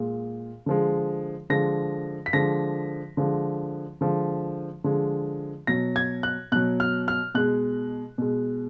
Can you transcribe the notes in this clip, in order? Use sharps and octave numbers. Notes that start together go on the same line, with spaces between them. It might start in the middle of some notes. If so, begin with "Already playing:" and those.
Already playing: A#2 G#3
D3 F3 G#3
D3 F3 G#3 A#6
B6
D3 F3 G#3 A#6
D3 F3 G#3
D3 F3 G#3
D3 F3 G#3
B2 F#3 A#6
G#6
F#6
B2 F#3 F#6
F6
F6
B2 G#3 F#6
B2 G#3